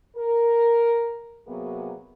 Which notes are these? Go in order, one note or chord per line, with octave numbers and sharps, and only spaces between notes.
A#4
C3 F#3 A#3 B3 F#4 G#4